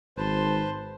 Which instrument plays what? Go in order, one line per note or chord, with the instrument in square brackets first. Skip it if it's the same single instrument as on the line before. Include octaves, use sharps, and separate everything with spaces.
[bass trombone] G#1 [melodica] B4 C5 [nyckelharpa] A5 C6